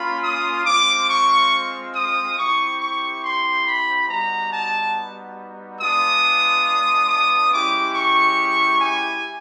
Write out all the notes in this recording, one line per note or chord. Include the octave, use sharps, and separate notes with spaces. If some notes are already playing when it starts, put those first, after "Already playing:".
Already playing: A#3 C#4 F4 B5
D#6
G#3 C4 F4 D6
C#6
D#6
C4 E4 G4 C#6
C#6
C6
B5
G3 B3 D#4 F#4 A#5
A5
G#3 B3 D4 F4 D#6
D#6
G#3 C#4 E4 G4 D6
C#6
G#5